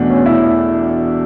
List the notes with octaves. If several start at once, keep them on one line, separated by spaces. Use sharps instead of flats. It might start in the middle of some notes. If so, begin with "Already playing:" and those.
Already playing: E2 B2 A3 D4
C#4
E4